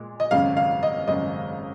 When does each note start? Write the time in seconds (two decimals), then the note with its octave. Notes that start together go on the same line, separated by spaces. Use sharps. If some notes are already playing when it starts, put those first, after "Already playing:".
Already playing: A#2 G#3
0.20 D#5
0.31 G#1 F#2 C#3 F5
0.57 F5
0.83 D#5
1.08 G#1 F#2 C#3 D#5